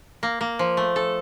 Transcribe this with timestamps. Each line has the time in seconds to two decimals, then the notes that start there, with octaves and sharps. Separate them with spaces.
0.23 A#3
0.41 A#3
0.59 F3
0.77 A3
0.96 A4